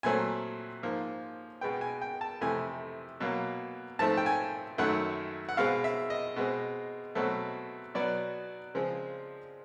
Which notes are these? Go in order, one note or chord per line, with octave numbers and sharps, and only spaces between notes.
A#2 F#3 A3 C4 G#5
G#2 F3 A#3
B2 G#3 B3 G5
G#5
G5
A5
F2 C3 E3 A3 G#5
B2 F#3 A#3
G#2 F3 A3 C4 A5
G5
G#5
F#2 D#3 F#3 A3 F#5
F#5
B2 G#3 C4 F5
E5
D#5
B2 G#3 C4
B2 F#3 A3 C4
B2 F#3 B3 D5
C#3 F3 G#3 C4